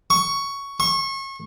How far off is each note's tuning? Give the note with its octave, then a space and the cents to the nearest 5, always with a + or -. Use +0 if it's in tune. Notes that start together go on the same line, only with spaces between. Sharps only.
C#6 +10
C#6 -30